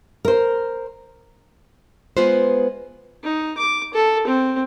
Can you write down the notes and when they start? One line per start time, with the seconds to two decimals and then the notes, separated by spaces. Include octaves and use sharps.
0.25 A#4 C5
2.17 G#3 B3 F4 B4 C5
3.23 D#4
3.57 D6
3.94 A4
4.27 C4